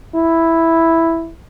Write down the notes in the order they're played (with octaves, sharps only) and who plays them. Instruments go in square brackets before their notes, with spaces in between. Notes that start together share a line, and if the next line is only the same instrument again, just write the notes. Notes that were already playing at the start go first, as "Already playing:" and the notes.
[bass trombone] E4